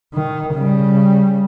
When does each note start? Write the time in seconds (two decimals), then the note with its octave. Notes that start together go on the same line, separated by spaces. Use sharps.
0.14 D#3
0.54 C#3 G3